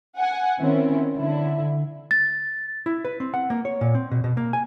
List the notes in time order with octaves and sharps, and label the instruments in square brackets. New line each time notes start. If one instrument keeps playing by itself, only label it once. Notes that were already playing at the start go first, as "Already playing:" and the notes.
[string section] F#5 G#5
D#3 C4 C#4 E4
D3 E4
[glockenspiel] A6
[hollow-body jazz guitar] E4
B4
C4
F#5
A#3
C#5
A#2
C4
B2
B2
A#3
G#5